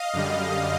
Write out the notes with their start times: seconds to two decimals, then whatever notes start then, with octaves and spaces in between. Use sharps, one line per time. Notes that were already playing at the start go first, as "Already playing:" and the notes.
Already playing: D#5 F5
0.14 F#2 D3 G3